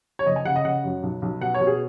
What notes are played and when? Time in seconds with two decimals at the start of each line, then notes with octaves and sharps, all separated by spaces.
0.19 C#5
0.26 F#1 D#5
0.36 G#5
0.45 C#3 F#5
0.56 D#5
0.65 C#3 F#5
0.84 F#2
1.03 B1
1.22 B1
1.41 B2 F#5
1.54 C#5
1.61 B2
1.67 G#4